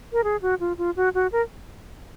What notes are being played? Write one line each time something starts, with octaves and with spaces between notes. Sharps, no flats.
A#4
G#4
F#4
F4
F4
F#4
F#4
A#4